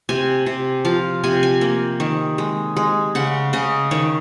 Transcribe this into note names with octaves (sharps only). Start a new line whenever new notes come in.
C3 G#5
C3
F3 F5
C3 G#5
G#5
A#3
D#3
G#3
G#3
C#3 F#5
C#3 D#5
D#3 C#5